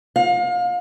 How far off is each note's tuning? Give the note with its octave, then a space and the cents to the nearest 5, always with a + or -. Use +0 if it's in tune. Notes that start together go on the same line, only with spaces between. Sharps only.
F5 +35